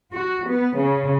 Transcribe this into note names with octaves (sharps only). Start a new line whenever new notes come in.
F#4
B3
C#3